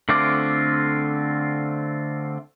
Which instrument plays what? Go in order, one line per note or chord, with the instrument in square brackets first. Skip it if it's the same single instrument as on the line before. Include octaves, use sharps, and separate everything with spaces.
[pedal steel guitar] D3 A3 C4 F4 D6